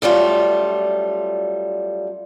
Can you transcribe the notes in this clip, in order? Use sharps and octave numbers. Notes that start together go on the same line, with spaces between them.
F#2 G3 A3 F4